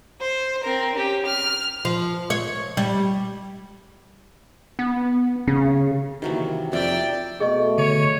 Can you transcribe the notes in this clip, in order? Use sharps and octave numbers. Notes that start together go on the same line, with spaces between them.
C5
C4 A#4
C#4 G4
F6
F3
C#5
G3
B3
C#3 C#4
C3 D#3 E3 F#3 A#3
F2 D5 E5 G5
B2 A3 G#4 D#5 C#6
D3 C#5